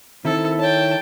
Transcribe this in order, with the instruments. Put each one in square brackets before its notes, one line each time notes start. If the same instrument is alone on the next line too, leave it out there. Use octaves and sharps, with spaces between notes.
[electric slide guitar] D#3 E4 [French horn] C4 [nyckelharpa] A4
[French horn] C#5 [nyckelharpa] G5 A5